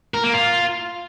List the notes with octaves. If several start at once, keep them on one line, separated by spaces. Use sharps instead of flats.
A#4
A#3
F4